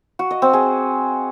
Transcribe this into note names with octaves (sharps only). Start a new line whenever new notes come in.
F#4
D#5
C4
G#4